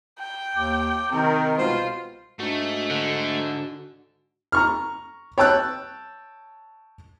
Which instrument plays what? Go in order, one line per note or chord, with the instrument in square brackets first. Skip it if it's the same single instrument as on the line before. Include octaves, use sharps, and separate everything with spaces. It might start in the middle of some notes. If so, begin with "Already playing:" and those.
[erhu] G5
[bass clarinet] D#2 [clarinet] D6
[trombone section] C3 D#3 [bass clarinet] C4 [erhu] A#4 [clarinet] G5
[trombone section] C2 B2 [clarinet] G#3 [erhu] F4 [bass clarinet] C5
[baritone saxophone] G#2 [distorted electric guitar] A3 [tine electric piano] D4 F#4
[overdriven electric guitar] D3
[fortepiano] A#5 C#6 F6
C#5 G5 A5 E6 F#6